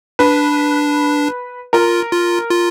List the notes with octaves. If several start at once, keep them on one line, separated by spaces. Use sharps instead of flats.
D4 B4
F4 A#4
F4
F4